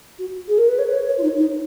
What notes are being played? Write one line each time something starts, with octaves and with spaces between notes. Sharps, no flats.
F#4
G#4
A#4
B4
C#5
B4
C#5
C#5
F4
D#4
D#4